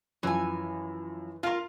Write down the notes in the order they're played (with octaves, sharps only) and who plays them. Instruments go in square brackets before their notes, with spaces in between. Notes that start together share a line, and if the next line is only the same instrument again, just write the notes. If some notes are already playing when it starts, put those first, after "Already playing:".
[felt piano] F#2 F3 [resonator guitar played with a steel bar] E3 G#5
[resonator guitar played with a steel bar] F4 A#4 [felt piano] F5 C6